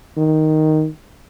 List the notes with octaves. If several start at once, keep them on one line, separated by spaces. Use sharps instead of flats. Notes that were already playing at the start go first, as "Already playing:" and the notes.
D#3